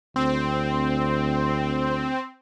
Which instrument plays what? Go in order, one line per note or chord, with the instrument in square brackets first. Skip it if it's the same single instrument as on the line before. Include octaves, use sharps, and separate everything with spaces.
[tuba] D2 [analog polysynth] C4